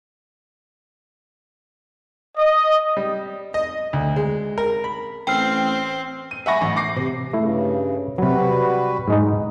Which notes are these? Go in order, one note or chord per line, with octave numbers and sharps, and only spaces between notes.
D#5
G3
D#5
D2
G#3
A#4
B5
A1 C4 G5 F6 C7
D#7
E5 F#5 G#5 B5 C#6 A#6
A1
D6 A#6 C7
C3
G2 C#3 A3 E4
C3 F#3 G3 F#4 B4
G#2 G#3 D#4